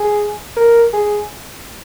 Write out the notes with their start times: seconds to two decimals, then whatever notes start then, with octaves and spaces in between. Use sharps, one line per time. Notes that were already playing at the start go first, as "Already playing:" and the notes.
Already playing: G#4
0.57 A#4
0.93 G#4